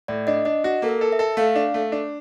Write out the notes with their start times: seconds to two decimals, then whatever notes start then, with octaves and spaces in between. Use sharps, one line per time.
0.08 A2 D5
0.27 D4 D#5
0.45 D4 D#5
0.64 F#4
0.82 A#3 A4
0.89 A#4
1.01 A4
1.12 E5
1.19 A4
1.37 A3 F5
1.56 D4
1.74 A3
1.92 D4